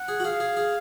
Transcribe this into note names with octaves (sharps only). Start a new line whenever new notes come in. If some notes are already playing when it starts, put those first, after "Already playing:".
Already playing: F#5
G#4
F#4
G#4 F5
G#4
G#4